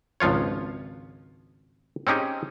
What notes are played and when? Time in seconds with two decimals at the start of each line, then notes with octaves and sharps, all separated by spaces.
0.20 G#1 C#2 F3 F4 C#5
2.07 C4 C#4 D#4 G4 G#4